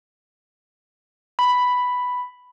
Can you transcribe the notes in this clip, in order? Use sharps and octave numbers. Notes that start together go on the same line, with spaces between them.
B5